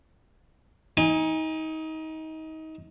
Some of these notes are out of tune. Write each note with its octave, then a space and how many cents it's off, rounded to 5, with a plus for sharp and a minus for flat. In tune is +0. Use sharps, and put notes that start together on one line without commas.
D#4 +25 G#5 -25